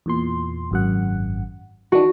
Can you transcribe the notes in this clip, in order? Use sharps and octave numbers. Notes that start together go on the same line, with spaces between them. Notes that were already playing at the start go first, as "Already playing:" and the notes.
E2 A#2 C6
G#1 F#2 F#5
D#3 E3 D4 F#4